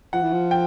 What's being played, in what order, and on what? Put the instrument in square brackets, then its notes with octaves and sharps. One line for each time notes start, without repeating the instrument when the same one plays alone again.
[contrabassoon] F3 [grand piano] F#5
[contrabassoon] E3
F3
[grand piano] G5